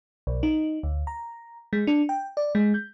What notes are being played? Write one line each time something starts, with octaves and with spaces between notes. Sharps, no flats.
B1
D#4
D2
A#5
G#3
D4
G5
D5
G#3
G6